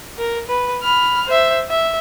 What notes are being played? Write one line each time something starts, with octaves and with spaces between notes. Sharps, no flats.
A#4
B4
B5 F6
C5 E5
E5